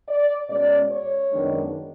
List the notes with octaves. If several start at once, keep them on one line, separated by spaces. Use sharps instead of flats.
D5
B2 G#3 C#4 D5
C#5
F#2 D#3 G#3 B3 D4